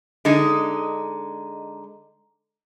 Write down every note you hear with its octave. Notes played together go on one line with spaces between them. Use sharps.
D3 G#3 D#4